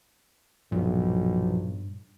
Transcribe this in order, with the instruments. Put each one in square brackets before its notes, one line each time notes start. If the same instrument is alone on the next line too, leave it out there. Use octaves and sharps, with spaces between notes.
[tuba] B1 [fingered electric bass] G2 [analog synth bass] A#2 [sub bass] F3